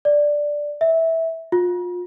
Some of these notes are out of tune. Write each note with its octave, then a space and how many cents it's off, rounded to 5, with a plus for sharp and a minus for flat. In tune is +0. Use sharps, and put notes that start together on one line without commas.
D5 +0
E5 -15
F4 +30